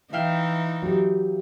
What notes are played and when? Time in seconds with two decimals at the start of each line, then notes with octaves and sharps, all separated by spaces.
0.13 E3 D#4 E5 F5 G5
0.82 F#3 G4